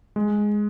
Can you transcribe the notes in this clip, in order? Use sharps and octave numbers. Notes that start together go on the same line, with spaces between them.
G#3